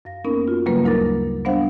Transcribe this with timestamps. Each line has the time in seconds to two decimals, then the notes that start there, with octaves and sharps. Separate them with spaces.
0.05 F#2 F5 A#6
0.24 A#3 B3 C#4 D#4 A#4
0.48 F4 F#4
0.66 G2 C#3 F#3 G3 A#3 B4
0.85 D2 D#4 A#4 D6 A6 A#6
1.45 G3 B3 D4 C5 F5 F#5